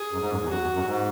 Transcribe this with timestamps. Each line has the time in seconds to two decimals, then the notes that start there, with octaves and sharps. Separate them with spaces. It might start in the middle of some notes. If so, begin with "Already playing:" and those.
Already playing: G#4
0.12 F#2
0.22 G#2
0.30 F#2
0.41 E2
0.49 F#2 F#4
0.61 E2
0.74 F#2
0.86 G#2